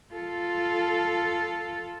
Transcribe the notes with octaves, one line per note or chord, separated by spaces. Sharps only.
F4 A4